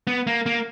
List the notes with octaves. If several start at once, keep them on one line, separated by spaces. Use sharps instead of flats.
B3
A#3
A#3